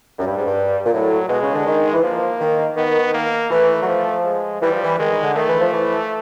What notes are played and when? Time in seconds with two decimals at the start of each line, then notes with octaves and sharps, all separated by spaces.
0.18 F#2 G3
0.27 G2
0.37 G#2
0.46 G2
0.85 A#2
0.92 A2 F#3
1.29 B2 G#3
1.42 C#3
1.54 D3
1.66 D#3
1.93 E3
2.03 F3 A#3
2.41 D#3
2.76 D#3 B3
3.14 A#3
3.50 E3 A3
3.83 F#3
3.88 F3
4.24 G#3
4.61 E3 G3
4.72 F3
4.83 E3
4.98 D#3 G#3
5.10 D#3
5.23 D3
5.35 D#3 A3
5.48 E3
5.60 F3
5.72 E3